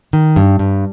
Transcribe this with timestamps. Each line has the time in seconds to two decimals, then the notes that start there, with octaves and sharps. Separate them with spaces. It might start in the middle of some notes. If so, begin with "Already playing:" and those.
0.13 D#3
0.36 G2
0.59 G2